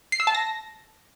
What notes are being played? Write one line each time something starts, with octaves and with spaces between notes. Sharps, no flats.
C7
E6
A5
A#6